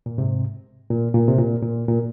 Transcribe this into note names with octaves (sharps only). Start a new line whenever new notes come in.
A#2
G#2 C3
A#2
A#2
C3
A#2
A#2
A#2